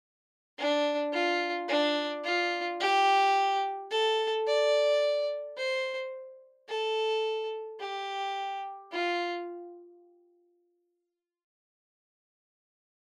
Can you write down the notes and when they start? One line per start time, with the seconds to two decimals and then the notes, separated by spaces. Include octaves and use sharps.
0.58 D4
1.13 F4
1.68 D4
2.24 F4
2.80 G4
3.91 A4
4.47 D5
5.57 C5
6.69 A4
7.81 G4
8.92 F4